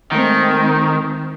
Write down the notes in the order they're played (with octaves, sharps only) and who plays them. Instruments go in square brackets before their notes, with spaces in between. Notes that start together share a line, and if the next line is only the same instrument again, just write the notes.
[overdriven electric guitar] D#3 [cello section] G#3 A3 C4